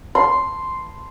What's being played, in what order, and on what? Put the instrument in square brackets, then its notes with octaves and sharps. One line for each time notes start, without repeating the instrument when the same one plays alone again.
[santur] C6